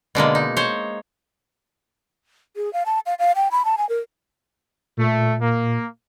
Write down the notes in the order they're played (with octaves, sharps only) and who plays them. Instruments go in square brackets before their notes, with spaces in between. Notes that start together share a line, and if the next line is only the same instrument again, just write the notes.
[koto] B2 D3 G#3 A#3
D#4
C5 C#5
[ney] G#4
F5
A5
F5
F5
G5
B5
A5
G#5
A#4
[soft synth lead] A#2 [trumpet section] A3
[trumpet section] A#3